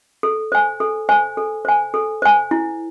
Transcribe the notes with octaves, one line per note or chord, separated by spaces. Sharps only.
A4
C5 G#5
A4
C5 G#5
A4
C5 G#5
A4
C5 G#5
E4